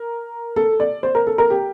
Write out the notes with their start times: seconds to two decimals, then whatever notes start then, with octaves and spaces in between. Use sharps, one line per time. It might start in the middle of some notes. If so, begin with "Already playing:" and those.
Already playing: A#4
0.56 A4
0.80 D5
1.03 C5
1.15 A#4
1.27 A4
1.38 A#4
1.50 G4